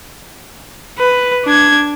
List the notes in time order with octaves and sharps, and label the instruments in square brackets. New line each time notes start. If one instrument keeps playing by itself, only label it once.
[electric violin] B4
D4 G#6